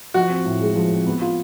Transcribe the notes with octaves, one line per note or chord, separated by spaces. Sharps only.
F3 F#4
C4
A2
G#3
F3
C4
B3
F4